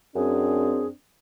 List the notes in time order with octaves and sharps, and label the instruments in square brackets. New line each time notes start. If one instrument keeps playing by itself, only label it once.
[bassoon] F#2 [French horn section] C4 D4 [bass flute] G#4